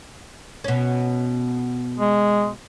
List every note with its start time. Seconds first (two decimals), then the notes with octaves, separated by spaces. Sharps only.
0.64 B2 C#4
1.99 G#3